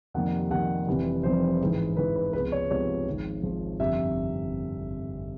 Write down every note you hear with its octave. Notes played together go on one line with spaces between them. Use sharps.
F2 C3 D#3 G3 A#3 F#5
F2 C3 D#3 G3 A#3 F#5
F1 F2 C3 E3 G3
F1 F2 C3 E3 G3 C5
A1 G#2 E3
A1 G#2 E3 B4
B4
C#2 C3 F3 G#3 B3 B4
C#5
C#2 C3 F3 G#3 B3 C#5
G#1 G#2 F3
G#1 G#2 F3
G1 F2 C3 E5